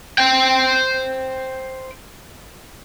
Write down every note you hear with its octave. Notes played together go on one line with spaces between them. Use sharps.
C5 G5